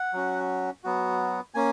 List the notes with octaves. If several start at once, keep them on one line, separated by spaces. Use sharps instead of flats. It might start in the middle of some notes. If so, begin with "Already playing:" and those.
Already playing: F#5
F#3 C#4 F#4
F#3 B3 F#4
A#3 C#4 G#5